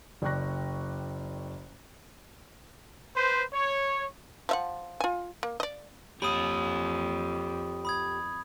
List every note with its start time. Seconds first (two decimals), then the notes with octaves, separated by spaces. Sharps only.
0.22 F#1 D5 G5 C#6 F#6 A#6
3.16 B4 C5
3.53 C#5
4.49 F3 E5 F#5
5.00 F4 G#5
5.43 A#3
5.60 D5 D#5
6.22 F2 G4 C#5 B5 D#6
7.85 B5 D#6 G#6